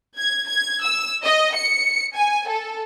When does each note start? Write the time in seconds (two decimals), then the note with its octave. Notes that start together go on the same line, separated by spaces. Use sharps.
0.18 G#6
0.47 G#6
0.83 E6
1.24 D#5
1.54 C#7
2.16 G#5
2.48 A4